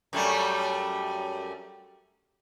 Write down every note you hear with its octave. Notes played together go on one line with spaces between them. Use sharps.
F#2 G3 A3